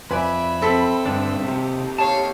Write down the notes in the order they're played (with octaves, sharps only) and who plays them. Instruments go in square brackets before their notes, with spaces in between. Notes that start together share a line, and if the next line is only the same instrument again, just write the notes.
[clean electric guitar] F2 D5 [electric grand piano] B4 G#5 [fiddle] E5 [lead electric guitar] B5
[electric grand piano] C4 A4 B6
[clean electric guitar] G2 D3 D4 [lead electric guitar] D#3 G3
[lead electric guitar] D#2 G4 [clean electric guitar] C3
[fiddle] C#5 F5 [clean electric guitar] A5